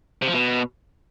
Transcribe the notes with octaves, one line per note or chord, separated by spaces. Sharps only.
C3
F3
B2